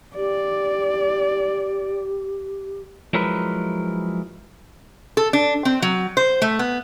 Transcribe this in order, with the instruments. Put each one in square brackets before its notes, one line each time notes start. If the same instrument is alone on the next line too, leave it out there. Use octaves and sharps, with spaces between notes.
[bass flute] G4 [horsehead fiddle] D5
[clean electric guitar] F3 F#3 G#3 E4 A#4 B4
[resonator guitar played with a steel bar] A4
D4
C4
F#3
C5
A3
B3